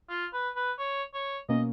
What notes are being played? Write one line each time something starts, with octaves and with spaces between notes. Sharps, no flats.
F4
B4
B4
C#5
C#5
B2 A#3 C#4 D#5